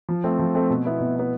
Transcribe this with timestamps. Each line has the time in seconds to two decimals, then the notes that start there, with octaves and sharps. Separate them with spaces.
0.09 F3
0.24 A3 C4
0.39 F3
0.55 A3 C4
0.70 B2
0.85 B3 E4
1.00 B2
1.16 B3 E4